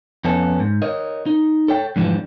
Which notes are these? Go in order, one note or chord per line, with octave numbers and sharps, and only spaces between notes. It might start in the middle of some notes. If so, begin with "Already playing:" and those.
F2 B3 C#4 A4
G#2
A#4 C#5 D#5
D#4
A4 C#5 G5
F2 G#2 D3 E3 F3 G3